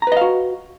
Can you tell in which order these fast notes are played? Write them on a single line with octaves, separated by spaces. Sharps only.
A#5 B4 D#5 F5 F#4